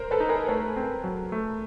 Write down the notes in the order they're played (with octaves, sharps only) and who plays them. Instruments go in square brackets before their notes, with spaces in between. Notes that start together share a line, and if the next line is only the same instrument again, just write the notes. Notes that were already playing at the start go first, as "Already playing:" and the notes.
Already playing: [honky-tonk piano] A#4 C5
A4 B4
[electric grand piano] D#4
[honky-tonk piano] G#4 A#4
[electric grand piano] A3 [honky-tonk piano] A4 B4
[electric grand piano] C4
F#3
A3